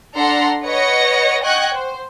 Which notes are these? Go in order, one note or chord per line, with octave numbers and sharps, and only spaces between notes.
D4 A4 F#5 A#5 C6
B4 C#5 D#5 F#5 A#6 C#7
D#5 F#5 G5 C#6 F#6 G#6
C5